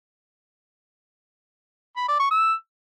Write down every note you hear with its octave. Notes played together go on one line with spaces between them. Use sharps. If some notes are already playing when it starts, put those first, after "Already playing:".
B5
D5
C#6
E6